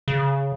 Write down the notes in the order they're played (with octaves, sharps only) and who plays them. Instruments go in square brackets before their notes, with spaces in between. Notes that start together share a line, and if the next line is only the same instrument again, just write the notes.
[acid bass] C#3